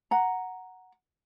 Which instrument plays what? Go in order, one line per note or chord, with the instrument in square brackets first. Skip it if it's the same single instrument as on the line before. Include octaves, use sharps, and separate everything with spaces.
[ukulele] F#5 A#5